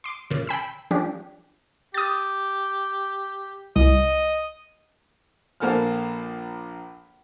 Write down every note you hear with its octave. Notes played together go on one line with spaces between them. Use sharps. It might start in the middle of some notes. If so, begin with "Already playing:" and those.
C6 D6
A#2 C#3
G5 B5 E6
F3 C#4 D4 G4
G4 D#6 A6
C2 D#5
A#1 A#3 A4 C5 G#5 F6